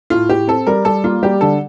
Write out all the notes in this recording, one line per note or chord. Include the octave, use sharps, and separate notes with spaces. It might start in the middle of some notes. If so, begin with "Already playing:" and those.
A2 F4
A2 G4
C4 A4
G3 A#4
G3 A4
A#3 F4
G3 G4
D3 A4